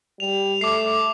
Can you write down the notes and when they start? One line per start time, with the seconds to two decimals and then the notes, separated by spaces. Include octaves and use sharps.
0.20 G3 F7
0.61 A3 D6 C7